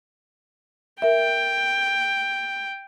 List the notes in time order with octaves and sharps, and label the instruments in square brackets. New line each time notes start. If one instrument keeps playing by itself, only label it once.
[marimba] A#4 E5 [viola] G5